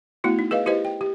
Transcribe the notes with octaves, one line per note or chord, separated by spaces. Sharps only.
A3 B3 E4 F#4
D#4
G#4 B4 D#5 F5
E4 G4 B4 C5 D#5
G5
G4